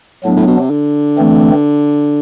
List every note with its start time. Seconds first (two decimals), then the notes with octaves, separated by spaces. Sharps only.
0.24 A2 F#3 B3 D4
0.36 A2
0.47 B2
0.60 C3
0.71 D3
1.18 E3 A3 C4